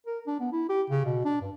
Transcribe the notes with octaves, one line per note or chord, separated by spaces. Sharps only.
A#4
D4
B3
E4
G4
C#3
B2
D4
G2